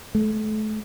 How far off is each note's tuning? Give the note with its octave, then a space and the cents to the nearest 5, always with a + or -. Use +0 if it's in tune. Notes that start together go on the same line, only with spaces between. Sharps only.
A3 -35